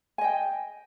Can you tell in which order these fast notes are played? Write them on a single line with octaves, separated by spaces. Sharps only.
G#5 D#5 G5